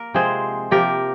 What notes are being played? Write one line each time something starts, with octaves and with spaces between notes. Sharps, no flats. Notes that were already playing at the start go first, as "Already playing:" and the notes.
Already playing: A#3 A#4
C3 F3 G#3 C4 G#4 C5
C3 F3 A#3 G4 A#4